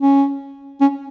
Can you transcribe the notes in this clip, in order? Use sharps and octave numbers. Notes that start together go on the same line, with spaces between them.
C#4
C#4